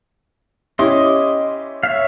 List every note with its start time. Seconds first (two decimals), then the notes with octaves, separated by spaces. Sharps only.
0.79 C#4 E4 G4 D#5 C6 D6
1.83 C#5 E5 F5